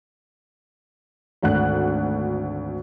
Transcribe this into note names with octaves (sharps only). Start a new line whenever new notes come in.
G#1 D2 F#5 F#6